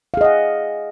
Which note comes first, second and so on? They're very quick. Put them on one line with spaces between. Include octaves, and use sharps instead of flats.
F5 G#4 D#5 F#5